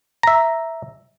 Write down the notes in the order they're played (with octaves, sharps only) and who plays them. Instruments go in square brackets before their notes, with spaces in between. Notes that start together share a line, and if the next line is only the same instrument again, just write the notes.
[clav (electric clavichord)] E5 A#5